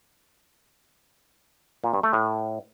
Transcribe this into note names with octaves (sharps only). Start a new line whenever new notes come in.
A#2
G2
A3
A2